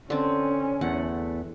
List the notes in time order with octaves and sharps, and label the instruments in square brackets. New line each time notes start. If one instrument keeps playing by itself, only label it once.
[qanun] D3 C4 [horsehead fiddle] C#4
[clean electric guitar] E2 A3 [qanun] F#5